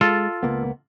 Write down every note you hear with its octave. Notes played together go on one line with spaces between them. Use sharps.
G#3 F4 A4
C#2 A#3 B3